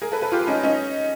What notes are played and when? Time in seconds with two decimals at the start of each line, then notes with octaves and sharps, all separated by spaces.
0.02 G#4 A#4
0.12 A4 B4
0.22 A4 B4
0.32 F4 G4
0.47 C#4 D#4
0.63 C#4 D#4